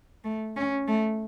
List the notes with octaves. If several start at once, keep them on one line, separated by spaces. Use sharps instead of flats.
A3
C#4
A3